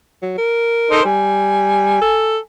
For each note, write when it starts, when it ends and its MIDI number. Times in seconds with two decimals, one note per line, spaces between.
0.22 0.36 54
0.38 1.05 70
0.91 1.00 63
0.91 1.00 69
0.91 1.00 72
1.05 1.97 55
1.05 2.41 80
2.01 2.38 69